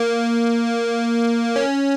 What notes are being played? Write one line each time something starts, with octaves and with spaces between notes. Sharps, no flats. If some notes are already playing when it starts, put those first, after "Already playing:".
Already playing: A#3
C#4